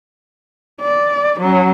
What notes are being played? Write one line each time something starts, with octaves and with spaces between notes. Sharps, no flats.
D5
F#3 C#4